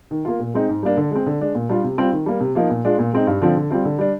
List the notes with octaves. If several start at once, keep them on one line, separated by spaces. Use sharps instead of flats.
D#3
A#3 F4
A#2
G#3 C4 D#4
G#2
G3 A#3 D4
D3
G#3 C4
D3
G#3 D4
A#2
G3 D4 F4
C3
G3 C4 F4
D#3
G3 A#3
C3
F3 A#3 D#4
A#2
G#3 D4 F4
A#2
G#3 C4 D#4
G2
D3 F3 C4
D3
G3 C4 F4
D3
G3 D4